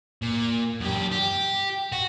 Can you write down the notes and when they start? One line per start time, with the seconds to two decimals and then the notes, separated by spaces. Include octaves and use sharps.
0.22 A#2
0.81 F#2 G4
1.12 G4
1.92 F#4